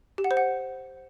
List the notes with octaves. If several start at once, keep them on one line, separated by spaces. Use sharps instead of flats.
G4
F#5
C5
F#5